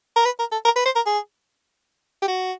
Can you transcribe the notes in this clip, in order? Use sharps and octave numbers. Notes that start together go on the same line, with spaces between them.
A#4
B4
A#4
A4
A#4
B4
C5
A#4
G#4
G4
F#4